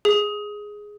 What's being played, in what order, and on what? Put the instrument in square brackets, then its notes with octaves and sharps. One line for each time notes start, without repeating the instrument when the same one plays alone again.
[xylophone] G#4